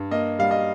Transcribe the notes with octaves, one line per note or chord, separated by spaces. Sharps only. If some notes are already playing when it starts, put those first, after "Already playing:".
Already playing: G2
A#3 D#5
G3 F5
D#5